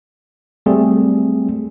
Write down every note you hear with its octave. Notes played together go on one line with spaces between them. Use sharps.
G3 A3 C4 G#4